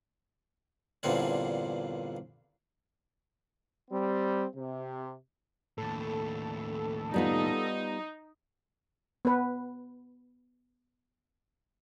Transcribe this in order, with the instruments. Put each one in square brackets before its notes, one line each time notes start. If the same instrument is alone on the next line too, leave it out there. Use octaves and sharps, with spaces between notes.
[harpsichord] E2 G2 A#2 D3 C4 C#4
[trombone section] G3 C4
C3
[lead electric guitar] D#2 A2 [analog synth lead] A4
[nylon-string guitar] G3 B3 F4 [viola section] D#4
[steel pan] B3 B4